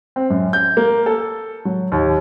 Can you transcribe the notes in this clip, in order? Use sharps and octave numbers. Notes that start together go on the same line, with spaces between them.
C4
F#2
G6
A#3
A4
F#3
D#2